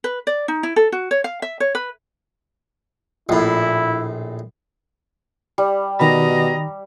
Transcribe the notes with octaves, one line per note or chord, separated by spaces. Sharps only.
B4
D5
D#4
E4
A4
F#4
C#5
F5
E5
C#5
B4
A#1 A2 E4
G3
B2 D#3 D#5 A#5 B5